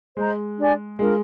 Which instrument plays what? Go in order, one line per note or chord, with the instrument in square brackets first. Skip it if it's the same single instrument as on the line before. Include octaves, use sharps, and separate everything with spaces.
[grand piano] G#3 [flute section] C5 D#5 A#5
[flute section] D4 G4 D5 G#5
[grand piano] G#3 [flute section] D4 F4 A#4 F5